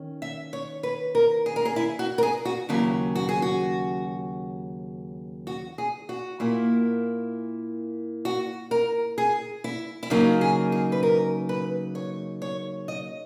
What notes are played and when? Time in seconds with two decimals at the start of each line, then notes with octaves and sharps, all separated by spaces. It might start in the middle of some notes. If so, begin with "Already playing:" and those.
Already playing: D#3 C#4
0.22 E5
0.53 C#5
0.83 B4
1.15 A#4
1.46 G#4
1.56 A#4
1.65 G#4
1.76 E4
1.99 F#4
2.18 A#4
2.23 G#4
2.45 F#4
2.69 D#2 C#3 F#3 E4
3.15 F#4
3.29 G#4
3.42 F#4
5.47 F#4
5.78 G#4
6.09 F#4
6.40 A#2 A#3 E4
8.25 F#4
8.71 A#4
9.18 G#4
9.64 E4
10.03 E4
10.10 C#3 F#3 A#3 D#4 F#4
10.41 G#4
10.72 G#4
10.92 B4
11.03 A#4
11.49 B4
11.95 C#5
12.42 C#5
12.88 D#5